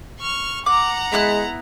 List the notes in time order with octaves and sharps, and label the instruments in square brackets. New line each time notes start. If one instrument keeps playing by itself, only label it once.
[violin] C#6 F6
[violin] F#5 A#5 [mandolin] D6
[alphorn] G#3 [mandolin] B3 E4 F#6